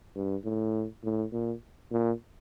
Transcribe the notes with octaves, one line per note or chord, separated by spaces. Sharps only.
G2
A2
A2
A#2
A#2